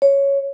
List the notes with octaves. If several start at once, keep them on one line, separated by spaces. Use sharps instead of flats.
C#5